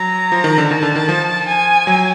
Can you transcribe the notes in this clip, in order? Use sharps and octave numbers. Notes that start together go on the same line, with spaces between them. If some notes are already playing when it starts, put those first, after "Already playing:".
Already playing: F#3 A#5
F3
D#3
D3
D#3 A5
D3
D#3
F3
G#5
F#3